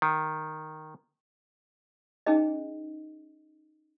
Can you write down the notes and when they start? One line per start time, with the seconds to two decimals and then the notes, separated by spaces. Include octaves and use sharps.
0.02 D#3
2.26 C#4 D#4 G#4 D#5